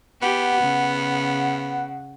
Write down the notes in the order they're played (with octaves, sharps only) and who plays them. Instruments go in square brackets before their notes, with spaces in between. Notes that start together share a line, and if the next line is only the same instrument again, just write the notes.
[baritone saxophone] B3 [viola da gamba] G4 [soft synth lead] F#5
[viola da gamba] C#3